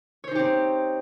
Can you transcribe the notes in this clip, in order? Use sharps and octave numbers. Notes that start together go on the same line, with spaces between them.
C4 D#4 G4 C5 C#5